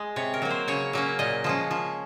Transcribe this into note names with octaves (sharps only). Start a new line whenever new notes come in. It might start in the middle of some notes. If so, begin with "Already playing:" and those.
Already playing: G#3 D#5
C3 C#5
A#4
F#3 A#3
C5
C#3 C#5
F#3 A#3 C#4
A#2 D#5
F3 G#3 C#4
F3